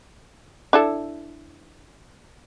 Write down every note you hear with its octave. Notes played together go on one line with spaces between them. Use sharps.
D4 E4 A4